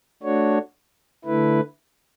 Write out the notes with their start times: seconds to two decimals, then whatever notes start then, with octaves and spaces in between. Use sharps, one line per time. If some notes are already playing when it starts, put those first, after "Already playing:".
0.23 A3 D4 F#4 C#5
1.25 D3 A3 E4 B4